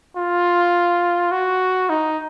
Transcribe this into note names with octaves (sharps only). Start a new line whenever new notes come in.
F4
F#4
D#4